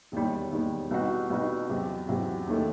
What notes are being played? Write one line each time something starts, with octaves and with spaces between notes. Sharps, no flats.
E1 D#2 D#3 G3
E1 D#2 D#3 G3
C2 B2 G3 D#4 F#4
C2 B2 G3 D#4 F#4
E2 C3 F#3
E2 C3 F#3
E1 D#2 D#3 A3